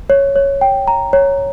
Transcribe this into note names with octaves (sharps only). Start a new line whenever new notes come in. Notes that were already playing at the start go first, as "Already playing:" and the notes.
C#5
C#5
G5
A#5
C#5